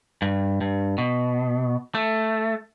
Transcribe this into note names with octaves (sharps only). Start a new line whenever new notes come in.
G2
G2
B2
A3